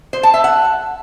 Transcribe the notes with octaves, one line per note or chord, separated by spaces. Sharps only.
C5
A5
E5
F#5